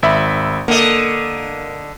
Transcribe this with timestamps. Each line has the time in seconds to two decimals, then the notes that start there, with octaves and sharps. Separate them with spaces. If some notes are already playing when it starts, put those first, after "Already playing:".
0.03 G#1 E5 B5
0.68 D3 A#3 D#5